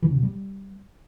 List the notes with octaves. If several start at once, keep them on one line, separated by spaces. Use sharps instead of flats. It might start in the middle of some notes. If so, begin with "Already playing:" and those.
E3
C#3
B2
G3